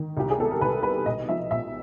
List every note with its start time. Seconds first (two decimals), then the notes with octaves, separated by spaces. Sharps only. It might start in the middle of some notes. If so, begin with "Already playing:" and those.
Already playing: D#3
0.17 C2 G4
0.30 G#4
0.38 B2 A4
0.51 A#4
0.61 C2 B4
0.83 G3 B4
1.06 B1 D#5
1.29 F3 E5
1.51 B1 E5